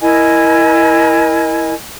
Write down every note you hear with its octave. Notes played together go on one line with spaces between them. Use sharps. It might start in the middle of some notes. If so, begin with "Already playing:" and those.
E4 A#4 D#5 G#5